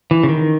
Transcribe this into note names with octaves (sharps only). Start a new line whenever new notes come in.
E3
C#3
D#3